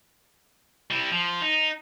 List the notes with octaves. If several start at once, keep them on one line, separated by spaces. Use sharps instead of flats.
G3 E4
F3
D#4